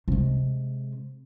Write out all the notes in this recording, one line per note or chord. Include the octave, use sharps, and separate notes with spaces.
C3 G#3